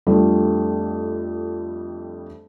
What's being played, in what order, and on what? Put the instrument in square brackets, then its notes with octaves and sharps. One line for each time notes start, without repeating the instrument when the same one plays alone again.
[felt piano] F2 G3 A3 D4